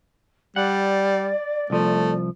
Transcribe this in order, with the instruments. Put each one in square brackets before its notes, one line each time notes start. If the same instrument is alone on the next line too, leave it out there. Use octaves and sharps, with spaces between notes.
[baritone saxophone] G3 [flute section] D5 [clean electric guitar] F#5
[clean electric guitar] C2 F3 [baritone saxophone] A3